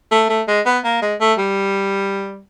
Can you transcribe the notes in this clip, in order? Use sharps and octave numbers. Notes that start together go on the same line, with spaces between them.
A3
A3
G#3
B3
A#3
G#3
A3
G3